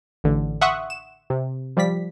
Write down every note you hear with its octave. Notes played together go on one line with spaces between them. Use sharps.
A1 D3
E5 F#5 C6 C#6 D#6 F#6
E7
C3
F3 G3 D5 B6